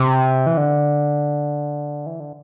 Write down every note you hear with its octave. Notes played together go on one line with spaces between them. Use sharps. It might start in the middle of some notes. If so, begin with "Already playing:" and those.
Already playing: C3
E3
D3
E3
D3